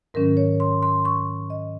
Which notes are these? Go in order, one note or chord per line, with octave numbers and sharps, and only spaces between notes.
G#2 D#3 F#3 C#4 A#4
C#5
C6
C6
C#6
D#5